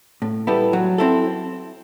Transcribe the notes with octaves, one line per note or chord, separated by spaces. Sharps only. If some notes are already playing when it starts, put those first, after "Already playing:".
A2
G3 B3 E4 A4
F#3
C4 E4 A4